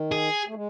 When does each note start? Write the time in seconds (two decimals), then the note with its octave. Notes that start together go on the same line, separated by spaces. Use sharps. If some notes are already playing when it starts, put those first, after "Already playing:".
Already playing: D#3
0.12 G#4
0.48 A3
0.54 G#3